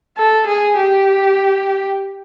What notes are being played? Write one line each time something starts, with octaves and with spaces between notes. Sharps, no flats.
A4
G#4
G4